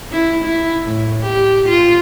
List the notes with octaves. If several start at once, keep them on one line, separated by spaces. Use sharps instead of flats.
E4
E4
A2
G4
F4